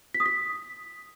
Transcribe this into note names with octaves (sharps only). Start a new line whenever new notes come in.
B6
D#6
B6